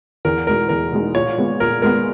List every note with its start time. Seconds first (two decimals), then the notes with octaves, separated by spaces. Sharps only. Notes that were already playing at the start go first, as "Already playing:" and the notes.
0.25 E2 A#4
0.46 B2 G#3 D#4 A#4
0.69 E2 A#4
0.92 B2 G#3 D#4
1.14 A#2 C#5
1.38 G#3 B3
1.60 A#2 A#4
1.82 G#3 B3 A#4